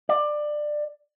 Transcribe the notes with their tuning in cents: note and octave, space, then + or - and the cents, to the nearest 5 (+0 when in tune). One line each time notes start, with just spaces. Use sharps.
D5 +20